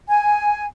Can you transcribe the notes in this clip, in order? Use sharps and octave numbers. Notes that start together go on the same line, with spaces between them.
G#5